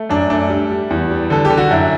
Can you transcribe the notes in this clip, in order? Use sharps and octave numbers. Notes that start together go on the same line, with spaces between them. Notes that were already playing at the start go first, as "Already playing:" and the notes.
Already playing: A3
F#2 D4
A3 D4
G3
G3
E2
G3
D3 A4
G4
D3
F#4
F#2 E4